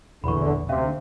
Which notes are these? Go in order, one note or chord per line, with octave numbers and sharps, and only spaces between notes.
E1 A#1 E2 D3 B5 C#6
D2 C3 C#4 E5 F5